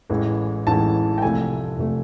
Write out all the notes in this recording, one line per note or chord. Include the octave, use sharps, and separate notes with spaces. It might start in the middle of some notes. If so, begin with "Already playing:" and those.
A1 A2 E3 G#3
A1 A2 E3 G#3 A5
G5
C2 C3 F3 A3 G#5
C2 C3 F3 A3